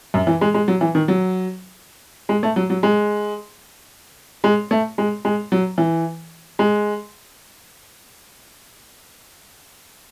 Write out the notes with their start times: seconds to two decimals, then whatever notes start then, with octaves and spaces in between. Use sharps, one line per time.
0.14 F#2
0.27 E3
0.41 G#3
0.54 G#3
0.68 F#3
0.81 E3
0.95 D#3
1.08 F#3
2.29 G#3
2.43 A3
2.56 F#3
2.70 F#3
2.83 G#3
4.44 G#3
4.71 A3
4.98 G#3
5.25 G#3
5.52 F#3
5.78 E3
6.59 G#3